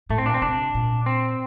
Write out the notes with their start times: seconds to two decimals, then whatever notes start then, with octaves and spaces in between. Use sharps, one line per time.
0.10 A2 A3
0.18 C4
0.26 A#2 D4
0.34 C4
0.42 C3 D4
0.74 A#2
1.06 C4